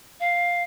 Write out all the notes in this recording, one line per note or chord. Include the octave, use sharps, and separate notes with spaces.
F5